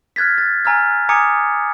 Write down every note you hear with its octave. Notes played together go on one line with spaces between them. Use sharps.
F6 F#6 G#6 A6 B6
A6
G#5 A#5 E6 F6 G#6
G#5 A#5 D6 D#6 G#6 C#7